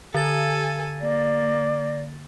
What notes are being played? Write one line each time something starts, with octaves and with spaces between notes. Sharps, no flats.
D3 A4 G#5 A6
A#3 D5